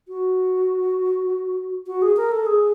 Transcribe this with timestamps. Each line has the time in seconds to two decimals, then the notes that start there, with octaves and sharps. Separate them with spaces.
0.08 F#4
1.87 F#4
2.02 G#4
2.17 A#4
2.32 A4
2.46 G#4